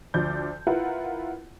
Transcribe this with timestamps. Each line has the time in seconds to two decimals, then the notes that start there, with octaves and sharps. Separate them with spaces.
0.14 D2 F3 D5 G6
0.67 E4 F4 A#4 B4 F#5